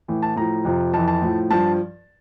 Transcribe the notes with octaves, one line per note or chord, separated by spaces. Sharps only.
A2 E3
A5
A2 F3 A#5
F2 C3 F3
F2 E3 A5
A5
A2 F3
G2 F3 A5